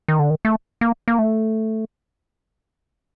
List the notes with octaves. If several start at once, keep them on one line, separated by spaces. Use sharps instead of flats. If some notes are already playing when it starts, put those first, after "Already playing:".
D#3
D3
D#3
A3
A#3
A#3
A3